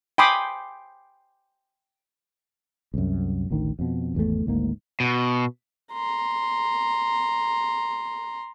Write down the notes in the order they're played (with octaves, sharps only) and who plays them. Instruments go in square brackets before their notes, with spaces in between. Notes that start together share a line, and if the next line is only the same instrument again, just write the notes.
[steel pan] G5 G#5 B5 C6 D6 D#6
[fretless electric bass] C2 F#2
A1 D2 D#3
F2 B2
G#1 E2 C#3 A3
G#1 D2 G#2 A#3
[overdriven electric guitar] B2
[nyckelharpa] A#5 C6